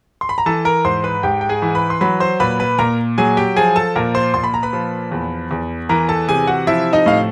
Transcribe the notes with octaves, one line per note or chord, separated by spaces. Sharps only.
C6
B5
A#5
E3 A4 A5
A#4 A#5
G#2 C5 C6
B4 B5
G#2 G4 G5
G5
G#4 G#5
E3
B4 B5
C6
F#3 B4 B5
C5 C6
A#2 B4 B5
B4 B5
A#2 A#4 A#5
F#3 G#4 G#5
G4 G5
F3 G#4 G#5
A4 A5
A#2 A#4 A#5
C5 C6
A#2 C6
B5
A#5
B4 B5
F3
E2
E2
E3 A#4 A#5
A4 A5
C3 G#4 G#5
F#4 F#5
F3 E4 E5
D#4 D#5
A2 F5